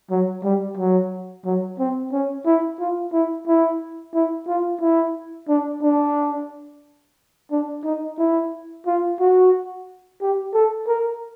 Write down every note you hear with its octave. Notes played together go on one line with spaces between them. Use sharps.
F#3
G3
F#3
F#3
C4
C#4
E4
F4
E4
E4
E4
F4
E4
D4
D4
D4
D#4
E4
F4
F#4
G4
A4
A#4